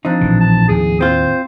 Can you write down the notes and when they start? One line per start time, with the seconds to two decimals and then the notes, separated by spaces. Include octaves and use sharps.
0.05 F3 C4 D4 D#4
0.21 A#1 A2 E3
0.40 A5
0.68 D#2 A2 G#4
1.01 C4 F4 C5